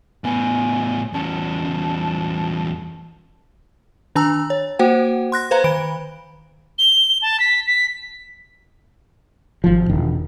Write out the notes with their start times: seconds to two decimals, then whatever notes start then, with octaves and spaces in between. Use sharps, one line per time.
0.24 A2 B3 G#5
1.13 E2 C#4 A5
4.15 D#3 D4 A5 A#5 E6
4.50 C#5
4.79 A#3 F#4 C5 F#5 G5
5.32 C6 F#6 A#6
5.51 B4 C5 F5 A#5
5.64 D#3 B5 D7
6.78 G7
7.22 A5
7.40 B6
7.67 B6
9.64 G#1 F3
9.89 E1 D#3